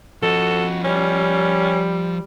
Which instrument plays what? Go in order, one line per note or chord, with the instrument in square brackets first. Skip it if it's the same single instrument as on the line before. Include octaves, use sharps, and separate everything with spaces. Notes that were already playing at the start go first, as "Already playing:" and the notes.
[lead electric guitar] F3 D#5 [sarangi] F#4 [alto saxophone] A4
[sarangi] G3 [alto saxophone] C#4